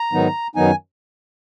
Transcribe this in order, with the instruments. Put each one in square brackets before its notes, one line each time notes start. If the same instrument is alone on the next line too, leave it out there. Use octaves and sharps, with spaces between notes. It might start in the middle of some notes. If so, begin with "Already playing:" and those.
Already playing: [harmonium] A#5
G#2 D#3 F#3 B3 D#4
F#2 D#3 F#3 B3 D#4 G#5